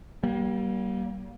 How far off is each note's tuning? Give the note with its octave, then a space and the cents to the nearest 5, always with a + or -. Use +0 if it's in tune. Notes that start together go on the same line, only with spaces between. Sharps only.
G3 -25 A#3 +30